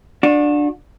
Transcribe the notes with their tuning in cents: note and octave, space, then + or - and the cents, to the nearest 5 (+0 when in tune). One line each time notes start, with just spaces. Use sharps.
D4 +5 F#4 -35